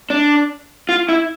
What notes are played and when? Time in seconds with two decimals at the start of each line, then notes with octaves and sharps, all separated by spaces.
0.10 D4
0.89 F4
1.09 E4